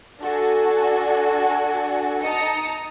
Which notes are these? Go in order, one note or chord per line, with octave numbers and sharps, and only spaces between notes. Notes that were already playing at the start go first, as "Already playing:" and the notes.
D4 F#4 A4 G#5
D#4 D#5 A5 A#5 D#6 C#7